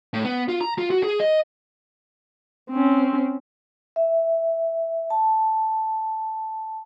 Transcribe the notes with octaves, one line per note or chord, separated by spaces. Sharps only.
A2
B3
F4
A#5
F4
F#4
G#4
D#5
C4 C#4
E5
A5